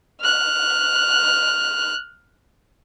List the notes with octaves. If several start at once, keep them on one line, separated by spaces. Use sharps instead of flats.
F6 F#6